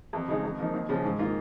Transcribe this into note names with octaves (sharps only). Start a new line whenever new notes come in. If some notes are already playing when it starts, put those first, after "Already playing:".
F2
C#3 G#3 D#4
F2
F3 A#3 D#4
D#2
C#3 F3 C#4
G#2
D#3 A#3 F4